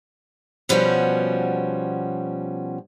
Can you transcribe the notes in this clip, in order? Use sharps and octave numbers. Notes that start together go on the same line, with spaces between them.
B2 F3 G3 C#4 F#4